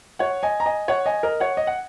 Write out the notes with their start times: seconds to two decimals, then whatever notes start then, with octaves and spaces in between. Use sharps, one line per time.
0.19 C#5 F#5
0.43 D#5 G#5
0.60 A#5
0.66 D#5 G#5
0.88 C#5 F#5
1.06 D#5 G#5
1.23 A#4 D#5
1.40 C#5 F#5
1.57 D#5
1.67 F#5